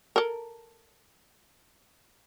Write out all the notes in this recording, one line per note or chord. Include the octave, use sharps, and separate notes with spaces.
A4 A#4